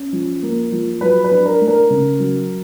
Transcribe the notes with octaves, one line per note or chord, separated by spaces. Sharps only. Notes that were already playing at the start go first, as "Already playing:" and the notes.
Already playing: C#4
F3
A#3
F3
F#3 B4
B4
D4
A#4
A3
A#4
C#3
F#3